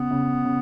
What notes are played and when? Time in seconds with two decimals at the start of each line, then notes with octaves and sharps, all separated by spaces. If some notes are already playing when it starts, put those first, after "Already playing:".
Already playing: C#3 B3
0.11 C#3
0.45 C#3